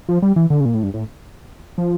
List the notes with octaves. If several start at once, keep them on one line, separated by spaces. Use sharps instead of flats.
F3
G3
E3
D3
C#3
A#2
A2
G2
A2
F3